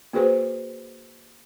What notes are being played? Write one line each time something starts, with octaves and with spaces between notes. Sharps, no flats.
A#3 F#4 G#4 B4 C5